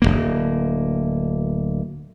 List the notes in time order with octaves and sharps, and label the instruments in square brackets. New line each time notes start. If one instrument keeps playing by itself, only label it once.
[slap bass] D1 C2 A#3